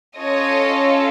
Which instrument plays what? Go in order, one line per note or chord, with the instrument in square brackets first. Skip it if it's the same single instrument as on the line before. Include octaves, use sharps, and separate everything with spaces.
[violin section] C#4 F4 A4 C#5 D#5